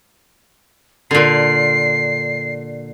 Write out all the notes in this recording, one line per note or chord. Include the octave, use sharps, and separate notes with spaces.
A#2 D3 C7